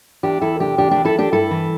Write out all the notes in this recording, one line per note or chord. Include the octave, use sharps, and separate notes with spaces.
E2 D4 G4
E2 E4 A4
C3 D4 G4
E2 D4 G4
E2 D4 G4
E4 A4
E2 D4 G4
G2 E4 A4
E3